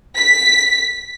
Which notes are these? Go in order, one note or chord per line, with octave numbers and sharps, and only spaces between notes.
B6